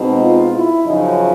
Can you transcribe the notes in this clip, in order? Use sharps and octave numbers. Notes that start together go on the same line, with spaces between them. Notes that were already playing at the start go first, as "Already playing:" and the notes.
Already playing: B2 G#3 C4 D#4
F4
E4
F#2 C#3 F3 D#4